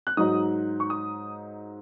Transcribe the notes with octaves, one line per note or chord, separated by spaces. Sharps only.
F#6
G#2 F#3 D#4 D#6
C#6
D#6